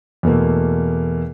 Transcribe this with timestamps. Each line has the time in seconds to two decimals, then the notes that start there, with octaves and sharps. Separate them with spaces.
0.23 E2 B2 A3 A#3